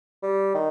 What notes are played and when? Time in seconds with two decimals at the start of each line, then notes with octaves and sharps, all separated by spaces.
0.23 G3
0.55 D#3